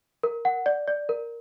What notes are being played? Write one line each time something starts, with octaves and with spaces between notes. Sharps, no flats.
A#4
F#5
D5
D5
A#4